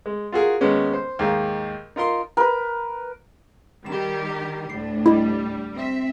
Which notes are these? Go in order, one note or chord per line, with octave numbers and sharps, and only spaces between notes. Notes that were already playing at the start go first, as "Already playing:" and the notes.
G#3
F4 F#4 G#4 A#4
D#2 G#3 B3 C#4
C5
D#2 G#2 F5
D#4 F4 A#4 C6
A#4 B4
D#3 G3 G4 E7
D2 A2 D4 C7
G3 E4 D#5
C4 E5